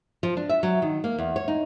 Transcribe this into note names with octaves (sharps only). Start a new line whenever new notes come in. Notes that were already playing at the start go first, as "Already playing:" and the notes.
F3
D4
E5
F#3
D#3
A#3
E2
C#5
D#4